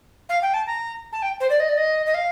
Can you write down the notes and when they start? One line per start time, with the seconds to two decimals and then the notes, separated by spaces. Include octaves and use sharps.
0.29 F5
0.42 G5
0.54 A5
0.67 A#5
1.13 A5
1.22 G5
1.40 C5
1.50 D5
1.60 D#5
1.69 D5
1.77 D#5
2.06 D#5
2.14 F5